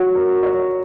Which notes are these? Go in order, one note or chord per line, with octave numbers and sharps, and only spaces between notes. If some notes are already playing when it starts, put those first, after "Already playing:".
Already playing: F#4 C#5
A#4
C#5